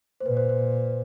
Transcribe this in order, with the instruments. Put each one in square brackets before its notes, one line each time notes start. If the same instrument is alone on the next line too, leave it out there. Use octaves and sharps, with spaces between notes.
[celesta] C5
[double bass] A#2 [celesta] B4
[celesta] C5
C5